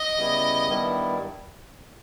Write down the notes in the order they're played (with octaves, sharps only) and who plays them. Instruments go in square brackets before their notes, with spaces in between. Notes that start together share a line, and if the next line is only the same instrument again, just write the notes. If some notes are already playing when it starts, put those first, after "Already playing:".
Already playing: [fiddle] D#5
[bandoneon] C#3 G3 B3 E4
G2 D#3 G3 B3 E4